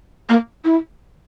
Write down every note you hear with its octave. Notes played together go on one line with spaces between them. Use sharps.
A#3
E4